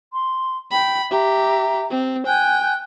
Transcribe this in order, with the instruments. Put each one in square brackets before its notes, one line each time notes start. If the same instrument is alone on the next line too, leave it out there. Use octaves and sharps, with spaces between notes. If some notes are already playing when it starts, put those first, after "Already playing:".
[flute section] C6
[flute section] G5 [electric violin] B5
[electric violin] G4 [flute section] E5 A#5
[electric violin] C4
[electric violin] G5 [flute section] G#5 F#6 G6